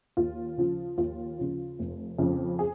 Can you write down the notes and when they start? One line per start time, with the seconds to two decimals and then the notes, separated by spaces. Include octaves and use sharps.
0.17 D#2 F4
0.58 C#3 F3
0.98 D#2 F4
1.39 C#3 F3
1.79 F1
2.18 F2 C#3 F3
2.59 G#4